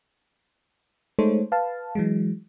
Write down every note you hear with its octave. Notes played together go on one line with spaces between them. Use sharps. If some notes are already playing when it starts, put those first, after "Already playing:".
G#3 A3 D#4 A4 C5 C#5
B4 F5 A5
E3 F#3 G#3